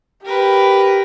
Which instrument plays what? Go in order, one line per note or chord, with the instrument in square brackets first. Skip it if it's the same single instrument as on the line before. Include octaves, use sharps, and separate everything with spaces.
[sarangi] G4 [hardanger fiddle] A#4 B4